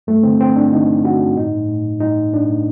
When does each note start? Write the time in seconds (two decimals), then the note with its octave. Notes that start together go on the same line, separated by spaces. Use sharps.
0.07 G2 A3
0.23 D3 C4
0.40 D3 C4
0.56 G2 D4
0.72 D3 D#4
0.89 G2
1.04 D3 F#4
1.21 G2
1.37 A2 D#4
1.53 A2
1.68 A2
1.85 A2
2.00 A2 D#4
2.17 A2
2.33 A2 D4
2.49 A2